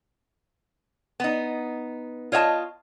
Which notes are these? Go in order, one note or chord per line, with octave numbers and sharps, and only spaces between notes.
B3 D#4
F4 C#5 D#5 F5 A5